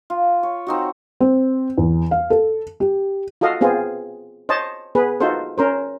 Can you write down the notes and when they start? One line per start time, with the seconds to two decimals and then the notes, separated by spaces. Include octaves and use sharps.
0.10 F4
0.43 C#5
0.67 C4 D#4 F#4
1.21 C4
1.78 E2
2.11 F5
2.30 A4
2.80 G4
3.41 F4 F#4 A4 D#5 F5
3.61 B3 C4 F4 G#4
4.49 C5 C#5 D#5 A5
4.95 B3 G#4 B4
5.20 D#4 F4 F#4 A4 C5
5.58 C#4 A#4 C5